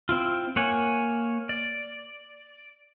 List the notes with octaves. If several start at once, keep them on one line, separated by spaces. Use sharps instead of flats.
C4 E4 F4
A#3 C#5 F#5 G#5
D5